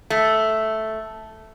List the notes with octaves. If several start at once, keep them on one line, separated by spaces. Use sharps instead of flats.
A3